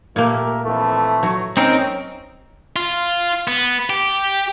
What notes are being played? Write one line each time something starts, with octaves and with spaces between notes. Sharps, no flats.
A#2 A3 A#3 G4 A#4
F2 E3 A3
F#3
C4 C#4 D#4 A#4
F4
B3
G4